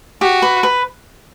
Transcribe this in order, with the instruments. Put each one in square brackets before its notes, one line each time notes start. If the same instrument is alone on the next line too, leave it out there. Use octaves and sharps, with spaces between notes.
[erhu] F#4 [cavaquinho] G4
[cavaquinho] B4
B4